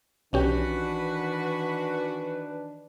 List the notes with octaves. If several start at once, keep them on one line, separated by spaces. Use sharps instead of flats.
B1 D#3 E3 C#4 D4 F#4 G4 B4